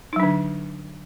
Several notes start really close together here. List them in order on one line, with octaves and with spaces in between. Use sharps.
D#4 F#3 D4 D3